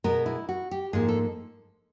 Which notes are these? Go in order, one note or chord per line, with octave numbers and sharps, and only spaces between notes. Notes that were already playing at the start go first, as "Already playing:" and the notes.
B2 G#3 B3 A#4
E4
F#4
G4
G#2 F3 A#3 G#4
A4